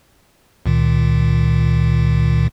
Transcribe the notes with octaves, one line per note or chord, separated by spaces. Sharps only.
C#2 A#2 D#3